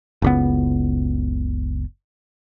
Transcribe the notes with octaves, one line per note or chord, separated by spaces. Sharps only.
F#1 C#2 B3